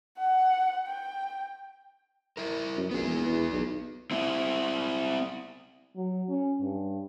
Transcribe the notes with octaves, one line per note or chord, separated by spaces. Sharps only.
F#5
G5
E4 A#4
F#2
A#1 B3 G#4
E1
E2
B1
C4 E4
F#3
C#4
G2